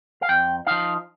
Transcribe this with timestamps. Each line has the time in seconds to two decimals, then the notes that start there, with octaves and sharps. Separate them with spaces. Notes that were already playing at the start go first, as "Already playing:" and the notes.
0.22 F5
0.29 F2 G5
0.67 F3 D#4 F5